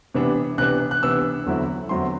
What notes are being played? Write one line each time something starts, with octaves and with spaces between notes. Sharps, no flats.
C3 E3 B3 D4
C3 E3 B3 D4 F#6
F#6
C3 E3 B3 D4 E6
E2 D3 F#3 C4 E4
E2 D3 F#3 C4 E4 C6